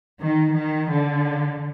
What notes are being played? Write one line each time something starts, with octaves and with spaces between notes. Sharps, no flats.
D#3
D#3
D3